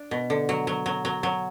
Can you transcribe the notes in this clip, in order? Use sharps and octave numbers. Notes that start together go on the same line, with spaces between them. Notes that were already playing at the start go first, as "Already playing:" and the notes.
Already playing: D4
B2
D3
F#3
F#3
F#3
F#3
F#3